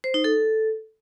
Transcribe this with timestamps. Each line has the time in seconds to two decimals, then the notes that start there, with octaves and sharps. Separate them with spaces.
0.04 C5
0.14 D#4
0.24 A4